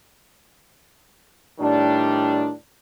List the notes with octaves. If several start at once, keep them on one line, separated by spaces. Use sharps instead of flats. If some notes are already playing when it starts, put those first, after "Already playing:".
A2 D#3 G3 D4